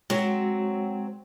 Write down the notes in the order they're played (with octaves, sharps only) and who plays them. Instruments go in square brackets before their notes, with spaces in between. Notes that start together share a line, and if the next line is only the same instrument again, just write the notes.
[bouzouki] F#3 C4 [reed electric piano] G#3 F#4